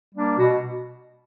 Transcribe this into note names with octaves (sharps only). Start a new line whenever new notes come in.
G3 A#3 D4
B2 F#4